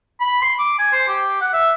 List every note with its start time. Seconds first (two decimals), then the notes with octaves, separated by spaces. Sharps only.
0.20 B5
0.42 C6
0.59 D6
0.79 G#5
0.92 C5
1.08 G4
1.41 F#5
1.53 E5